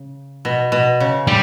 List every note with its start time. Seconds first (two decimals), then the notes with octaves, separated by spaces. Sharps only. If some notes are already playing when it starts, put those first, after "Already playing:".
Already playing: C#3
0.45 B2
0.72 B2
1.00 C#3
1.27 D3 G3